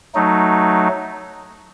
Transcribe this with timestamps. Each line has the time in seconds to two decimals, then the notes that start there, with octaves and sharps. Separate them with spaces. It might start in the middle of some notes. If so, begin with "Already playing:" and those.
0.15 F#3 A3 D#4